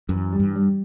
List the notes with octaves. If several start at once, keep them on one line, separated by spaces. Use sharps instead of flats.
F#2 E3
G3
G2
G3